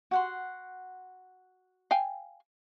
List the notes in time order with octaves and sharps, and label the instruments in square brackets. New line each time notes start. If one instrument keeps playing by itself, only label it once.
[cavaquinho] F#4 F#5 C6
[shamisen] F5 G5 G#5